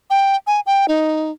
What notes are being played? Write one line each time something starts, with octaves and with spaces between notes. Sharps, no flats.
G5
G#5
G5
D#4